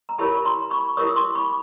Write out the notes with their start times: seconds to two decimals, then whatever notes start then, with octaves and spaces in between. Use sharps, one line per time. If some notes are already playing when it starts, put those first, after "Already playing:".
0.09 A#5
0.18 E4 G4 A#4 C#5 A5 B5
0.45 A#5 C6
0.70 B5 C#6
0.97 E4 G4 A#4 C#5 C#6 D#6
1.16 C6 D6
1.35 B5 C#6